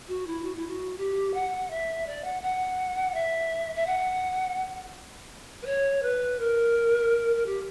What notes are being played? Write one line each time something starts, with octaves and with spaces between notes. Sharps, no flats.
F#4
E4
F#4
E4
F#4
G4
F#5
E5
D5
F#5
F#5
E5
E5
F#5
B4
C#5
B4
A#4
A#4
G4